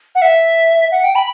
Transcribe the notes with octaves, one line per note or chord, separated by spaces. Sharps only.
F#5
E5
F#5
G5
B5